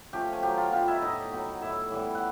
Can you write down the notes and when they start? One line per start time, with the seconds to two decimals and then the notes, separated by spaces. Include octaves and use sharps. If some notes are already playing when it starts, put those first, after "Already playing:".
0.13 F3 A3 C#4 G4 G5
0.33 G#5
0.43 F#3 G4 G5
0.57 F4 F5
0.72 B3 D#4 F4 F5
0.88 E4 E5
1.02 A2 D#4 D#5
1.32 F#3 B3
1.61 A2 E4 E5
1.92 E3 G3 B3
2.15 F#5